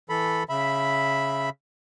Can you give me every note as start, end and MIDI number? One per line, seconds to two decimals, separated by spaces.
0.09 0.43 52
0.09 0.43 69
0.09 0.43 83
0.49 1.50 49
0.49 1.50 76
0.49 1.50 83